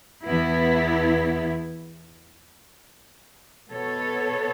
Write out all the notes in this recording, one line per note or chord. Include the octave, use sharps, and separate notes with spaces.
E2 E3 B3 E4
B2 B3 A4 C#5